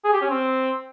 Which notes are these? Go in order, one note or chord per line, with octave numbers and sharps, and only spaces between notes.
G#4
G4
C#4
C4